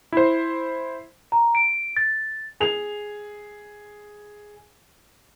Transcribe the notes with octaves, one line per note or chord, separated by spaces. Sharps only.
E4 C5
A#5
D7
A6
G#4 F7